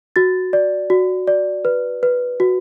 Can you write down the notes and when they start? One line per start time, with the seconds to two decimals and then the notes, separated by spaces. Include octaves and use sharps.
0.16 F#4 A6
0.53 D5
0.90 F#4
1.27 D5
1.65 B4
2.03 B4
2.40 F#4